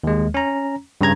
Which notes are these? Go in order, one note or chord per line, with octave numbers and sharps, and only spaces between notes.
D#2 G#3
C#4 A#5
G2 C#3 A#5 G#6